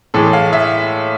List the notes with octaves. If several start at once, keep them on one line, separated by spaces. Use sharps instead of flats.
A2 E3 G#3 A4
F5
E5